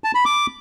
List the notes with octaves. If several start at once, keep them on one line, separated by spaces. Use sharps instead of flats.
A5
B5
D6